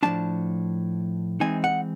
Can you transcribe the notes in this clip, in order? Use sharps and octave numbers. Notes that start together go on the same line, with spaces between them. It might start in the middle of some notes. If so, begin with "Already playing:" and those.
A2 F3 A3 D4 A5
E3 G#3 C4 D#4 G#5
F#5